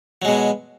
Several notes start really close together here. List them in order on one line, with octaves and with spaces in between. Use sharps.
F#3 G#3 B2